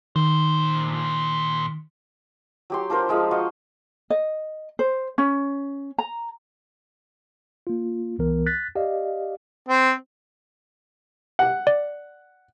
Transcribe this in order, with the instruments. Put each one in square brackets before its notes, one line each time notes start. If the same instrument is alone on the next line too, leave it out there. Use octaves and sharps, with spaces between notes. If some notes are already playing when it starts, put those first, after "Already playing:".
[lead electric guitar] A#2 C5 [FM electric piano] D#3
[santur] F#3 G4 C6
D4 F4 A#4 C5
F3 G#3 F5
F#4 C5 D#5 F5
[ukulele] D#5
C5
C#4
A#5
[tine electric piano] A#3 F4
C2 E3 B3 A#4
F#6 A6 B6
G4 D5 D#5 F5
[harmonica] C4
[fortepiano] F#5
[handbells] D5